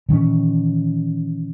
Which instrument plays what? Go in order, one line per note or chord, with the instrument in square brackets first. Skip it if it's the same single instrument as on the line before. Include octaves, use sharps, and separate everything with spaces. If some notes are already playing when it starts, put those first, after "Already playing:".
[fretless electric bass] A#2 D#3 E3 C#4